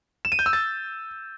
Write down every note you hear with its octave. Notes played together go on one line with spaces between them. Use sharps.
E7
D#7
G6
E6
A6